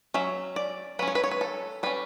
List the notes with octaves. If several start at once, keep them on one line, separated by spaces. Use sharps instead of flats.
F#3 C#4 E5
D5
F#3 C#4 B4
C#5
B4
C#5
B4
A4
G3 C#4 B4